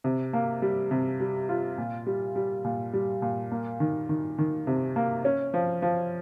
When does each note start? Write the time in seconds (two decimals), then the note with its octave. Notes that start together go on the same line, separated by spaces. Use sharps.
0.04 C3
0.33 A#3
0.62 G3
0.91 C3
1.20 G3
1.49 F4
1.78 A#2
2.07 G3
2.36 G3
2.64 A#2
2.93 G3
3.22 A#2
3.52 A#3
3.80 D#3
4.09 D#3
4.38 D#3
4.67 C3
4.96 A#3
5.25 C#4
5.54 F3
5.82 F3